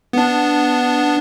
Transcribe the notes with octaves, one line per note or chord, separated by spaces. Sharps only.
B3 D4